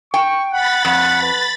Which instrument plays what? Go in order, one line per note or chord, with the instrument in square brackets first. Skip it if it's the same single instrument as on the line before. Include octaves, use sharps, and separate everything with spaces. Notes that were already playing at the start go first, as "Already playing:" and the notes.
[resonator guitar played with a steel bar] G5 [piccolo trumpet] C#6
[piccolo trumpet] F#5 [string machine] B5 A6
[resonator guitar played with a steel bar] F2 [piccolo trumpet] F#5
[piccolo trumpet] B4